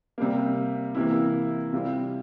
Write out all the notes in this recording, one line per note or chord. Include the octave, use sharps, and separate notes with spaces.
C3 G3 A#3
C3 E3 A#3 E4
C3 G3 C4 F4